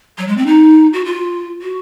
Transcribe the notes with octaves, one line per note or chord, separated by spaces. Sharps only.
F#3
G#3
C4
D#4
F#4
F4
F#4